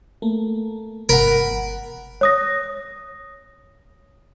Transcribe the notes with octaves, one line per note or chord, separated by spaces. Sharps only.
A3 A#3
G1 A#4 F#5 A#5 B5
C#5 D#6 A#6